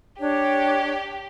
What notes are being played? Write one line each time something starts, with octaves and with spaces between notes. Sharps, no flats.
D4 G4 C#5